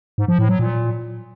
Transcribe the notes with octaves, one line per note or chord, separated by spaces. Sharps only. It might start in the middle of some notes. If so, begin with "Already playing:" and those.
G#2
F3
A2
F#3
A#2